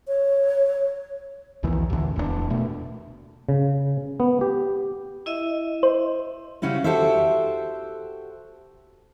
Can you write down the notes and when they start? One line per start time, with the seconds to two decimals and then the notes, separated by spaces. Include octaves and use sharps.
0.08 C#5
1.63 B1 E2 D#3 E3
1.90 A1 D2 D3 E3
2.16 D1 E2 E3 D4
2.50 B2 A3
3.49 C#3
4.20 B3
4.41 G4
5.26 E4 D#5 E5
5.83 C5
6.62 C#3 G3 C#4 E4 F#4
6.84 F#4 G4 A4 C5 E5